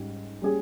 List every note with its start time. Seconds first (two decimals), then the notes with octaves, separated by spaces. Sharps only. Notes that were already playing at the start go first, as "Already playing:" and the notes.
Already playing: G#2 G3 C#4
0.42 G3 C#4 G#4